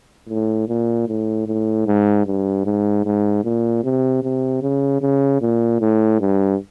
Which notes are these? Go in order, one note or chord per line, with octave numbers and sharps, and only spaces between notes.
A2
A#2
A2
A2
G#2
G2
G#2
G#2
A#2
C3
C3
C#3
C#3
A#2
A2
G2